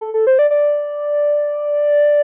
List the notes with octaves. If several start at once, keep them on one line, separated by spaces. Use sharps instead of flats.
A4
A4
C5
D5
D5